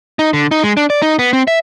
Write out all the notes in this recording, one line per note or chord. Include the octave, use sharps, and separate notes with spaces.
D#4
D3
D#4
G#3
D4
D5
D#4
B3
C4
E5